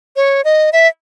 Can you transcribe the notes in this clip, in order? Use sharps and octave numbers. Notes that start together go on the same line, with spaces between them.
C#5
D#5
E5